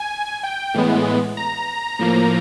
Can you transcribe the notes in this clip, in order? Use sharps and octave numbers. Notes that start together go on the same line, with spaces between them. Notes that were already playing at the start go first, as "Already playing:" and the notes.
Already playing: G#5
G5
A2 E3 G#3 B3
A#5
A2 F3 A#3